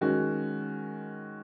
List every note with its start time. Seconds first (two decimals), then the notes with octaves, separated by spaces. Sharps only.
0.01 D#3 G#3 C#4 F#4